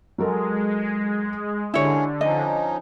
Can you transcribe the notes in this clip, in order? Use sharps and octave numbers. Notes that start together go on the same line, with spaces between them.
F#3 G#3 A4 A#4
D3 G#3 C#4 D4 E4 G4 G#4 C#5
F3 C#4 D#4 D#5